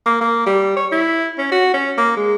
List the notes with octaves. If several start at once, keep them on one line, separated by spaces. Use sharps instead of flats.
A#3
A#3
G3
C#5
E4
C#4
F#4
C#4
A#3
G#3